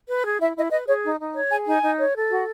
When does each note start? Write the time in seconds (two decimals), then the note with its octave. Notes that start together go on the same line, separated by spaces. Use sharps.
0.08 B4
0.24 G#4
0.39 E4 E5
0.56 E4 D#5
0.71 B4 D#5
0.87 G#4 C#5
1.04 D#4
1.20 D#4
1.35 C#5
1.51 G#4 G#5
1.67 D#4 G#5
1.82 D#4
1.98 C#5
2.15 A4
2.30 F#4